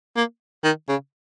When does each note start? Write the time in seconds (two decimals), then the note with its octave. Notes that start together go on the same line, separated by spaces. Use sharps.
0.17 A#3
0.64 D#3
0.89 C#3